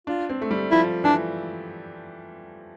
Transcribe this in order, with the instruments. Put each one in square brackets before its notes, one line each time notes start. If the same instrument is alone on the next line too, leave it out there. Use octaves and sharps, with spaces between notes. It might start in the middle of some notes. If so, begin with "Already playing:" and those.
[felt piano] D4 [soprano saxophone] F4
[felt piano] C4
A3
G3
[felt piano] F3 [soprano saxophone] E4
[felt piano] E3 [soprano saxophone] D4